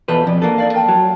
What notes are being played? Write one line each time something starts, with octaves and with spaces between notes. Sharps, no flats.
E2 B2 F4 A4 B4 C5
F2 D5
A#3 D4 F#4 A4
D#4 D5 F5
A#4 G5 A5
F#3